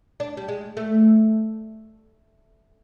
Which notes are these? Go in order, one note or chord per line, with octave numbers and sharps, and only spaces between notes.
D4
G3
G#3
A3